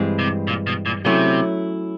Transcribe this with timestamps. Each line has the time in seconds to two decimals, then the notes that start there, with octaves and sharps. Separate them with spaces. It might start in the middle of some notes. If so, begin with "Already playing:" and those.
Already playing: G2 E3 G#3 C4
0.19 C3
0.47 A#2
0.67 B2
0.86 A#2
1.05 C3 F#3 A3 C#4 E4